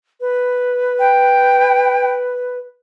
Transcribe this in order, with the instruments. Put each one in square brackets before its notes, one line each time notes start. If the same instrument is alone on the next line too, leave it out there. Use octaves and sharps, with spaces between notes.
[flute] B4
[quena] G5